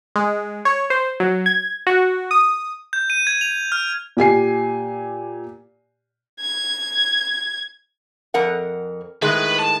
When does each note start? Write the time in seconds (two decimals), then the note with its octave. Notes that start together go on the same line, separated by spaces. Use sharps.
0.16 G#3
0.65 C#5
0.90 C5
1.20 F#3
1.46 G#6
1.87 F#4
2.31 D#6
2.93 G6
3.10 D#7
3.27 G#6
3.41 F7
3.72 F6
4.17 A#2 G4 G#5 C7
6.41 G#6
8.34 F2 A#4 F#5
9.22 A2 D#3 G#3 B4
9.59 A5